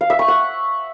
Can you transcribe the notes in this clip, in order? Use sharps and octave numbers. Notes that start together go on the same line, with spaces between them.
F5
E5
C#6
F#5